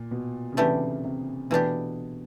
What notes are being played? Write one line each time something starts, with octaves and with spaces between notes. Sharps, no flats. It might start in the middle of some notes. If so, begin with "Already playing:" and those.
Already playing: A#2
B2
C#3
C3 E3 A3 D4 G4
C3
B2 E3 A3 D4 G4